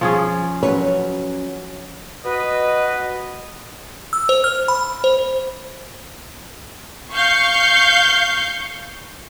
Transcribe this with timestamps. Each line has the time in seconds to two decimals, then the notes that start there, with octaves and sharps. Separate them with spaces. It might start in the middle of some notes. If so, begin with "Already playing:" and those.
0.01 F3 C#4 G#4
0.63 F#3 C#4 B4 C#5
2.24 F#4 B4 D#5
4.13 E6
4.29 C5
4.44 F6
4.68 B5
5.04 C5
7.13 F5 C#6 G6